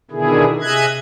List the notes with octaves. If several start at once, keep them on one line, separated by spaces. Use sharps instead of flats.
B2 D3 D#3 E4 G#4
C3 G#4 D#5 E5 F#6 G#6